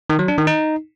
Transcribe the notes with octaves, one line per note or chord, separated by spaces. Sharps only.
D#3
F#3
D4
D#3
D#4